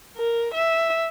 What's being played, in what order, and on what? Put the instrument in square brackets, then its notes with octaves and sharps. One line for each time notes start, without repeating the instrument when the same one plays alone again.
[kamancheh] A#4
E5